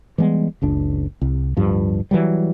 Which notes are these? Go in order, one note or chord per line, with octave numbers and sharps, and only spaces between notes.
E3 G3 G#3 B3
F#1 C#2 D4
C2
D1 G2 F3
E3 F#3 G3